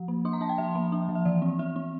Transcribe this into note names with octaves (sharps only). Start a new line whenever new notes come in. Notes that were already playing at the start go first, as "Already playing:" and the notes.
Already playing: F3
A#3
D4 C6
A#5
D4 A5
G5
F3 E5
A#3
D4
F3
E5
E3 D5
C4
C4 E5
C4